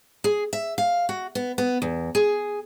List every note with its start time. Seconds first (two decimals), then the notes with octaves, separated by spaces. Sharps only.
0.24 G#4
0.53 E5
0.78 F5
1.09 F#4
1.35 B3
1.58 B3
1.82 E2
2.15 G#4